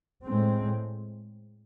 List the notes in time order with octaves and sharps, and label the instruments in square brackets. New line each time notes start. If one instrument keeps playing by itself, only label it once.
[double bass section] A2 G#3 C4